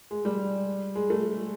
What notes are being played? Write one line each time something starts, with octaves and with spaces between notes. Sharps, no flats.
G#3
G3
G#3
A3